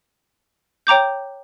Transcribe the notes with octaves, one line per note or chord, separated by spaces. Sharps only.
C#5 G5 A#5 D6 G6